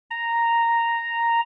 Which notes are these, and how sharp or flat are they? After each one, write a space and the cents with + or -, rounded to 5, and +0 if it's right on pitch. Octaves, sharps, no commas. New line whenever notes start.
A#5 -5